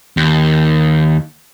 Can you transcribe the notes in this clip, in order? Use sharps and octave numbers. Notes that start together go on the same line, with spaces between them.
D#2